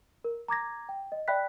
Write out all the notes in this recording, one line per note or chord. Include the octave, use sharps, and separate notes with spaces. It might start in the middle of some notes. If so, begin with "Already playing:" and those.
A#4
A#5 D6 G#6 A#6
G5
D#5
D5 E5 G5 B5 F#6 B6